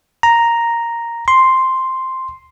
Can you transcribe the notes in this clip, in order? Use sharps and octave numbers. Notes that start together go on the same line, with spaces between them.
A#5
C6